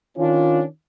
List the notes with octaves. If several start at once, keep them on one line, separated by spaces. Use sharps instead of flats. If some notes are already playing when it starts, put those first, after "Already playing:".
D#3 C#4 D4 F4